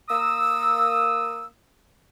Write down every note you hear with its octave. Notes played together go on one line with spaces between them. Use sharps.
A#3 D#6 E6